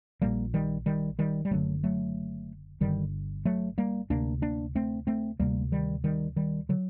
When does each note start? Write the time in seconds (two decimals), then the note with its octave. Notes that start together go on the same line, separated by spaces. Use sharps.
0.21 A#1 A#2 G3 A#3
0.54 D#3 G3
0.86 D#3 G3
1.19 D#3 G3
1.45 G3
1.51 F#1 F#2 D3 F#3 A3
1.84 F#3 A3
2.80 G1 G2 D3 D#3 G3
3.45 F#3 A3
3.78 G3 A#3
4.10 D2 C3 A#3 D4
4.42 A#3 D4
4.75 A3 C4
5.07 A3 C4
5.40 D2 C3 G3 A#3
5.72 D#3 G3
6.04 D#3 G3
6.36 D#3 G3
6.69 D3 F#3